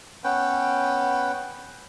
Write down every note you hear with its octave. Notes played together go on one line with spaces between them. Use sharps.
B3 C#4 B4 G5